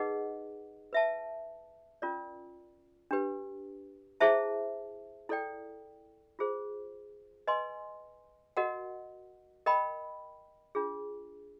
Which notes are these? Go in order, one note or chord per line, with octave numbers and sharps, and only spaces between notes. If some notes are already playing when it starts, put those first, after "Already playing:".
Already playing: D#4 G#4 B4 D#5 F#5
B4 E5 A5
C#4 F4 A#4 D5
D4 G4 B4
E4 G#4 C5 E5 A5
E4 A4 D5 G5
F4 G#4 C5
B4 D#5 G#5 C6
F#4 A#4 D#5 F#5
A#4 D#5 G5 B5
D4 F4 G#4